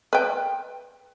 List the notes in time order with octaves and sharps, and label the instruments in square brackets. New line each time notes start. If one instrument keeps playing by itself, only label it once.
[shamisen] B4 G5